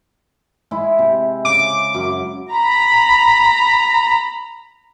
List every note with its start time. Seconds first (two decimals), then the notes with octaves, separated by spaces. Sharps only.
0.71 G#3 E4
0.99 C3
1.45 C#3 D6
1.94 F#2
2.52 A#5 B5